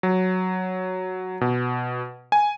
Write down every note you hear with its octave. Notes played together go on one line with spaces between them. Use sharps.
F#3
B2
G#5